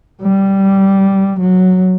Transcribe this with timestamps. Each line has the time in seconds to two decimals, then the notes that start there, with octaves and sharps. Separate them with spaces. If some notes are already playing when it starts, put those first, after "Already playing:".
0.22 G3
1.41 F#3